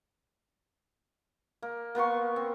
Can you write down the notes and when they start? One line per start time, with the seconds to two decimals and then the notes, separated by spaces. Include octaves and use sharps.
1.62 A#3
1.95 A#3 B3 C6 C#6
2.36 C4